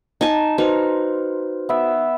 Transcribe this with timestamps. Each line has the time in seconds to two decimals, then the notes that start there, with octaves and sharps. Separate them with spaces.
0.21 D#4 G#5 A5
0.58 D#4 F#4 B4 C5
1.69 B3 E5